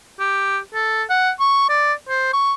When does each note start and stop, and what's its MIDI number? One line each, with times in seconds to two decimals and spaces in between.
0.19 0.58 67
0.74 1.03 69
1.09 1.31 78
1.40 1.64 85
1.69 1.93 74
2.09 2.29 72
2.33 2.54 85